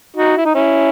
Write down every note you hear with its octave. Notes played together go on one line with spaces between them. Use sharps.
D#4 F#4
E4
D#4
C#4 E4